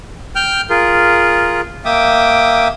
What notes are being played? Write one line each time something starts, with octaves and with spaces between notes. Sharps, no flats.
G5 F6 G6
F4 G#4 A#4
A#3 E5 G5 D6 D#6